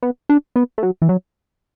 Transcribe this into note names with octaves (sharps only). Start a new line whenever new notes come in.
B3
D4
B3
A3
F#3
E3
F#3